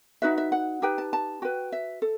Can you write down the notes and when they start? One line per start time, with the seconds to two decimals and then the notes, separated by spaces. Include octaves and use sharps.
0.22 D#4 F#4 B4 E5
0.38 E5
0.52 F#5
0.82 D#4 G4 B4 G5
0.98 A5
1.13 A5
1.42 F#4 B4 G5
1.72 E5
2.02 A4